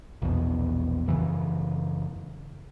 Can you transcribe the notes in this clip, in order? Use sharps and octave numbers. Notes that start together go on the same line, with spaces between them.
A#1 E2 B2
F#2 C#3 E3